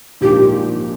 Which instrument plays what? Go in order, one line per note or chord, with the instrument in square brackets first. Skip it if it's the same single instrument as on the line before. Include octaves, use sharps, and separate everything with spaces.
[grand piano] A#1 G#2 F3 A#3 D4 [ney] G4